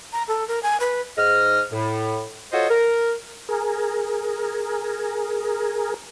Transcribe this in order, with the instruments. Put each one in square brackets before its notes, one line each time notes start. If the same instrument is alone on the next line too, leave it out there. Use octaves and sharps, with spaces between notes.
[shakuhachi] A#5
A4
A#4
G#5
B4
[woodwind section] G#2 D#5 F6
A2
F4 F#4 A4 C5 C#5 D#5
A#4
[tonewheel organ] G#4 A#4